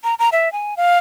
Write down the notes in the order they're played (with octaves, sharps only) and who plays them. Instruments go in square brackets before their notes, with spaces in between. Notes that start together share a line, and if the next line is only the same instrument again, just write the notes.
[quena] A#5
A#5
E5
G#5
F5